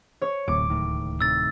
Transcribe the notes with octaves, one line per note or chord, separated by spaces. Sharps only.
C#5
D1 A2 C3 D6
C#2 A2 D#3
A2 C3 D#3 E6 A6